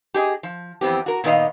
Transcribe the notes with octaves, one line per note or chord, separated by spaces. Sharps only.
G4 G#4 D#5
F3
F2 E3 B3 C4 G4
F#4 A#4
A#2 D#3 B3 G4 D#5 F5